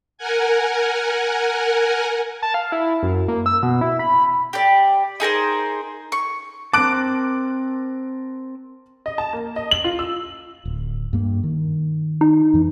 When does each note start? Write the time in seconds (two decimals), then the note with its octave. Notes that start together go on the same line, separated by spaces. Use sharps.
0.18 A#4 F#5 G#5
2.42 A5
2.54 F5
2.72 E4
3.03 F#2
3.28 A#3
3.46 E6
3.63 B2
3.81 E4
3.99 B5
4.53 G4 D5
5.20 D#4 G#4 A#4 C5
6.12 C#6
6.73 C4 A#4 A5 D6 F#6 D7
9.06 D#5
9.18 A5
9.33 A#3
9.56 D#5
9.71 F#7
9.84 F4
9.99 E6
10.65 D1
11.13 G2 A#3
11.44 D#3
12.21 D#4
12.54 F2 E3